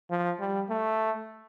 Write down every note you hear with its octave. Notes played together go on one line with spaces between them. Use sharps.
F3
G3
A3